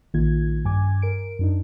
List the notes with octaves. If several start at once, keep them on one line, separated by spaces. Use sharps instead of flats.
A#1 D#3 A#3 F4 G#6
G2 G#5 D6 G#6
A#4 D7
F#2 D4 D#4